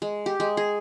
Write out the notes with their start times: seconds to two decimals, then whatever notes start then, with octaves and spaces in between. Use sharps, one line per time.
0.02 G#3
0.26 G4
0.40 G#3
0.57 G#4